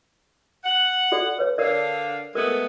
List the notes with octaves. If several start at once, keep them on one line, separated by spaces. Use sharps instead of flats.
F#5
F#4 A4 D5
B4 C#5
D3 D4 A#4 D5 F5
G#3 A3 B3 A4 A#4